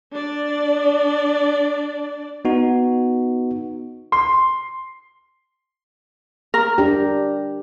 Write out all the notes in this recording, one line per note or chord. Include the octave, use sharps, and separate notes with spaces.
D4 D5
B3 D#4 F#4
C6
A#4
D4 G4